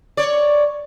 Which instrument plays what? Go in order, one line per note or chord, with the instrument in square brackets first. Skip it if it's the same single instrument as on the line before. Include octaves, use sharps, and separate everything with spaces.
[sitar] C#5 D5